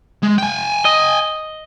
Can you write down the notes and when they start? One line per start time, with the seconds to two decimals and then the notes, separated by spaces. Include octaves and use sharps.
0.23 G#3
0.38 G5 G#5
0.85 D#5